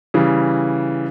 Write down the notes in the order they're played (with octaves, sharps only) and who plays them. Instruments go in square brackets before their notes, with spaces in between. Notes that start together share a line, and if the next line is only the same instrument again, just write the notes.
[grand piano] C#3 E3 G3